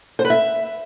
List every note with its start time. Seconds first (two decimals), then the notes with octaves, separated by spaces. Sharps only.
0.19 C5
0.25 B4
0.30 E5